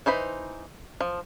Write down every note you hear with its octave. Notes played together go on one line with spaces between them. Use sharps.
E3 D#4 C5 B5
F3